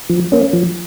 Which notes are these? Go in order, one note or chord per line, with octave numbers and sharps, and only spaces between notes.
F3
A#3 C#4
F3